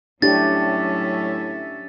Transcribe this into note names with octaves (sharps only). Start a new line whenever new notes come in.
A2 F#3 C#4 D4 G4 E5 A6